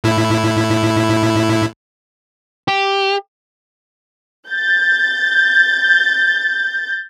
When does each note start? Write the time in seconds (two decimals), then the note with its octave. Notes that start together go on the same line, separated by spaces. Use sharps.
0.04 A2 E4
2.68 G4
4.49 G6 A6